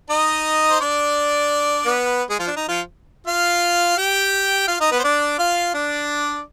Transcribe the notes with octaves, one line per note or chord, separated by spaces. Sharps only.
D#4 D#5
C5
D4 D5
B3 B4
G#3 G#4
F3 F4
D4
D#4
F3 F4
F4 F5
G4 G5
F4 F5
D#4 D#5
B3 B4
C5
D4 D5
F4 F5
D4 D5